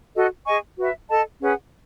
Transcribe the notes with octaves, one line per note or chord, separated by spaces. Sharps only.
F#4 A4 D#5
G#4 D#5 G#5 C#6
F#4 B4 E5
A4 D#5 A5
C#4 G#4 B4 F#5